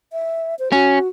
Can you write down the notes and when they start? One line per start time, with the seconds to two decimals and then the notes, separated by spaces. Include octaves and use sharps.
0.12 E5
0.59 C5
0.72 C#4 F#4